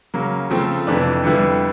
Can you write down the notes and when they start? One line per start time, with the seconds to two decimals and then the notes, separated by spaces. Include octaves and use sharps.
0.14 C#3 F#3 A#3
0.50 C#3 F3 A3 C4
0.87 F2 C3 E3 A3 D4
1.24 F2 D3 G3 B3 E4